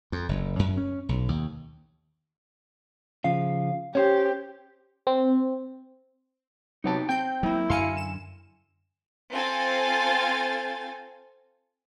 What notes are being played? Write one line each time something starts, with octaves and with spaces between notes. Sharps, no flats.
F2
F#1
F#2
C#4
B1
D#2
C#3 F3 F5
C#4 G4 C5 C#5
C4
C3 F#3 B3 D#4 G4 A5
C4 G5 G6
F#3 A#3 E4
F#2 D3 F5 G#5 A5 C6 C#7
E7
C4 F4 A4 G#5 A6